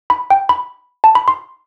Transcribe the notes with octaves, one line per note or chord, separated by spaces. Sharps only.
B5
G5
B5
A5
B5
C6